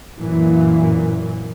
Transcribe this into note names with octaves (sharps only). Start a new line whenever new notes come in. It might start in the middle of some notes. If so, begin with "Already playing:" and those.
F#2 A#2 E3